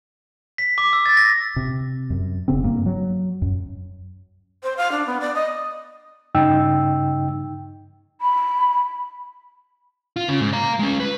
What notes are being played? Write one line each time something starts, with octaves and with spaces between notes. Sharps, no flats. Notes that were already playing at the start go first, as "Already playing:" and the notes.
B6
D6
E6
A6
A#6
C3
F#2
F1 C#3 B3 C4
G2 A#3
F#3
F#2
C5
F5
D4
B3
D5
D#5
G2 C#3 D#4 G5 E6
B5
F4
C#3
G#2
F5 A#5
G#3 C#4
B4